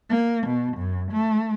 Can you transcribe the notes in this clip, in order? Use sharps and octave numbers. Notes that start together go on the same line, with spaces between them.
A#3
B2
F#2
A3